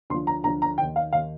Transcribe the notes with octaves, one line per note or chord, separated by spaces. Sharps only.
D2 D3 F3 C6
A#5
D2 D3 F3 A#5
A#5
D#2 D#3 G5
F5
D#2 D#3 F5